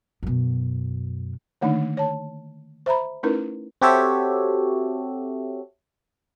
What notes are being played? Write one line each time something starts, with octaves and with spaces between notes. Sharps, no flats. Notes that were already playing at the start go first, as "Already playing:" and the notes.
F#2 B2
D3 D#3 A3 A#3 D4 D#4
C#5 A5
C5 E5 A#5 B5
A3 C#4 D#4 E4 A#4 B4
C4 F#4 G4 A4 C#5 E5